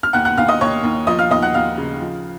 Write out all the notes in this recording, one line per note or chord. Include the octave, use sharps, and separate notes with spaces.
F6
D#2 F#5 F#6
F#5 F#6
D#2 F5 F6
D#5 D#6
D#2 C#5 C#6
D#2
F3 D#5 D#6
F5 F6
D#2 D#5 D#6
F#5 F#6
D#2 F5 F6
C#3
F3